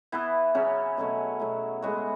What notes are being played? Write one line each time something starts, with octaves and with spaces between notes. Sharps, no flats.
E3 B3 E4
C#3 F#3 C#4
B2 F#3 A3 C#4
B2 F#3 A3
A2 G#3 B3 F#4